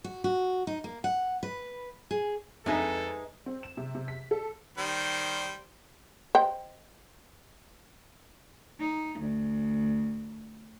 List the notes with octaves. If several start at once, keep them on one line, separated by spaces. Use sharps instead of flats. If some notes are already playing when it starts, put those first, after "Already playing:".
F#4
F#4
D#4
A#3
F#5
B4
G#4
F2 G#3 D#4 A4 B4 E5 G#5 A#5
C4
E7
C3
C3
B6
A4
D#3 G3 C5
C5 D#5 G5
D#4
D2